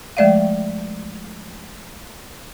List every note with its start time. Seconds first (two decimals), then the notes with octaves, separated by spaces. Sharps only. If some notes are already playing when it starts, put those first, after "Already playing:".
0.17 F3 G#3 A3 D5 E5 F5